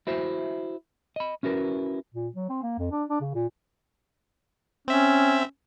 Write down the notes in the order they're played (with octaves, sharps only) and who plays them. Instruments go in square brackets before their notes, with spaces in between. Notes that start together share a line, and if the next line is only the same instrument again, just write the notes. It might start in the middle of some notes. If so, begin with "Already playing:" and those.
[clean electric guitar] E4 F#4 C5 E5
D#5 B5
C#4 E4 F#4 A#4 B4
[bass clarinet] A#2
F#3
C4
A#3
F2
D4
D4
C#3
A#2
[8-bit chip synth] C4 E5 [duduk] C#4